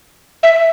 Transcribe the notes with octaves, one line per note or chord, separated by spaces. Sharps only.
E5